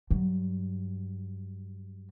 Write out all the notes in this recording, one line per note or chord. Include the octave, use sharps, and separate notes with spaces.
G2 F#3